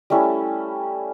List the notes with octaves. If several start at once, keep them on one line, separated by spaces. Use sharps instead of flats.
G3 A3 C#4 E4